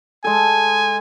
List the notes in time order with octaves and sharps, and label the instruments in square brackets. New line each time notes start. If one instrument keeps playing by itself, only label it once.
[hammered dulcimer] G#3 A4 [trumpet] G#5